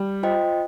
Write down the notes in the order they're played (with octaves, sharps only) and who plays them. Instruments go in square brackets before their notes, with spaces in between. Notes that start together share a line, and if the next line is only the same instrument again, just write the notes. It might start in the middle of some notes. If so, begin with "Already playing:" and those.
Already playing: [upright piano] G3
[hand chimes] F4 C5 D#5 G5